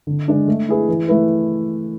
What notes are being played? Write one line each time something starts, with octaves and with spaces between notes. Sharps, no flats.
D3
G#3 D4
A3
E4 G#4 B4
E3
A3 E4 B4